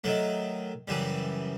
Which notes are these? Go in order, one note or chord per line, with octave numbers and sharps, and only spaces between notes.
D#3 F#3 A3
F#2 C#3 E3 G3